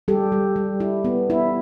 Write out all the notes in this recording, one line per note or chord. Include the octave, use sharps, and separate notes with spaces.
G3 G4 A4
G3
G3
E4
B3
E4